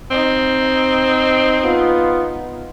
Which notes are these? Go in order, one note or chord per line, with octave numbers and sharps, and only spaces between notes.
C4 D#4
B3 F4